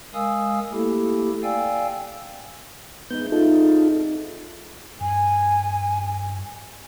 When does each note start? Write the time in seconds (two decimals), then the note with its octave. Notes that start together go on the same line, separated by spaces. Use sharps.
0.14 G#3 A#4 F5 G#5 D#6 E6
0.72 A3 A#3 E4 G4 A4
1.43 D5 F5 G5 G#5 E6
3.11 G#2 E3 B3 D#4 G6
3.32 C4 D#4 F4 A4 D#5 E5
3.52 G#2 D5
5.01 G2 G#5